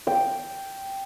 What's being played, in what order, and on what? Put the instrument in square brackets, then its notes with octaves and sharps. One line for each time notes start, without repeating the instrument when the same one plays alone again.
[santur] G5